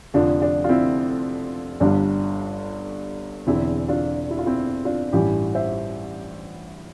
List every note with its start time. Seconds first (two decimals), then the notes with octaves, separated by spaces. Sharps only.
0.14 F1 F2 D3 F3 D4
0.42 D4
0.64 F4
0.69 C4 E4
1.80 G1 G2 D3 G3 D4
3.47 E1 E2 D3 C4 E4
3.88 D4 F4
4.31 E4
4.39 F4
4.46 C4 E4
4.85 D4 F4
5.13 A1 G2 E3 G3 E4 G4
5.55 C5 E5